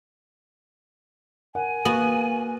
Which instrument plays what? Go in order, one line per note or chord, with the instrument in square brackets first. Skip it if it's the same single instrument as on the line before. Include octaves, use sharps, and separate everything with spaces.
[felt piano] A#4 F#5 [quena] G#5
[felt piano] A#3 [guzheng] B3 F#4